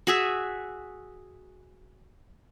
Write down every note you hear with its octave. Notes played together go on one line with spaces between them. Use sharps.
F#4 G#4 E5